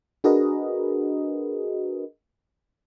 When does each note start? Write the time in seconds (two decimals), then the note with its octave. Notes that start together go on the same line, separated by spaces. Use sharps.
0.24 D4 F#4 G#4 A#4 B4 D#5